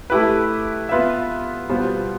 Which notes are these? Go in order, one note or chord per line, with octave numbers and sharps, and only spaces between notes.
A3 E4 G4 B4
B3 F4 B4 E5
B2 G3 B3 F4 C5